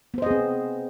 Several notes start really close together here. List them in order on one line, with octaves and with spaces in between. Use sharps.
B3 C5 D#5 G#4 C4